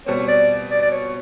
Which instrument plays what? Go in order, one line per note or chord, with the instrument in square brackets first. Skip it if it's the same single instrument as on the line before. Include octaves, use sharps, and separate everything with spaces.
[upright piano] B2 G3 C4 [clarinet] C#5
[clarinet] D5
D5
D5
C#5